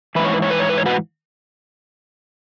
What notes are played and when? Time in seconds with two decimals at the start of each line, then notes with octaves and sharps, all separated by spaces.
0.15 G#2 E3 B4
0.24 C#5
0.34 B4
0.42 C#5
0.50 B4
0.59 C#5
0.69 B4
0.78 C#5
0.86 F#4 B4